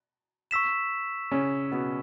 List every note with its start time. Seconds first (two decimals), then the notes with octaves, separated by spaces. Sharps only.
0.51 C#6 E6 B6 E7
1.31 C#3 C#4
1.72 B2 B3